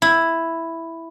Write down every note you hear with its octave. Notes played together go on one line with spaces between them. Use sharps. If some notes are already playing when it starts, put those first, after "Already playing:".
E4